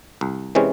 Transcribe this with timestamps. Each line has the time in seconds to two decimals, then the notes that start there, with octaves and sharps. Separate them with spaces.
0.21 C2
0.55 C3 E3 G#3 C#4